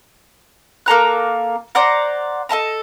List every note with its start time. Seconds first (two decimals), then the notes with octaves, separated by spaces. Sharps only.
0.86 A#3 A4 A#5 F#6
1.75 C5 D5 F#5 A#5
2.49 A4 D#5 A5 A#5